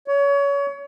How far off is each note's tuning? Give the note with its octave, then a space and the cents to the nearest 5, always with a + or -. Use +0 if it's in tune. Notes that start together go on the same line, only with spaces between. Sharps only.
C#5 +30